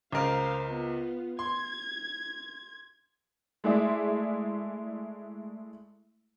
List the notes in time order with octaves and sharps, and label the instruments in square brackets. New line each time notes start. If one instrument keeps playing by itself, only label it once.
[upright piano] C#2 A#4 [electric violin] C5 F5
[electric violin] B3 F4
[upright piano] C6 [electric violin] G#6
[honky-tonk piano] G#3 A3 E4 G#4 D5 E5